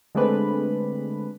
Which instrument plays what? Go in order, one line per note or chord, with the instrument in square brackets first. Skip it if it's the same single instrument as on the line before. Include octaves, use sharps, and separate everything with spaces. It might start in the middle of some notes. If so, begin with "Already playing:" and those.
[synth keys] D3 G#3 A3 C4 D4 B4